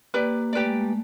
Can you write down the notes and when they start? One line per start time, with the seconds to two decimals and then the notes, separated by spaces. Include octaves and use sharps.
0.14 A#3 G4 B4 D5
0.53 A3 G4 B4 D5
0.66 G#3
0.81 A3